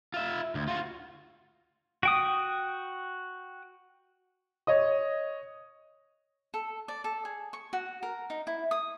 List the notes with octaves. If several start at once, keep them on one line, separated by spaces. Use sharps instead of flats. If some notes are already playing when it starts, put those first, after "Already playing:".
F4 E5
D2
F4 F#4
F#4 G5 D#6
C#5 D#5 D#6
A4
D5
A4
G#4
C#6
F#4
A#4
D#4
E4
D#6